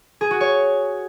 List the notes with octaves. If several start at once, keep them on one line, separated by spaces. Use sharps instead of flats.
G#4
F#4
C#5